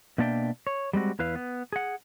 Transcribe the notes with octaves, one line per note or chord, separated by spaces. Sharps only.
B2 A#3 D4 D5 E5 G5
C#5
G3 G#3 C4 F#4
E2 E4 B4 F5
B3
G#4 F#5